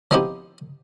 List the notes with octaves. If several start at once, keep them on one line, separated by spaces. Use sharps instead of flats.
F3 B3 C4 D#4 E4 G4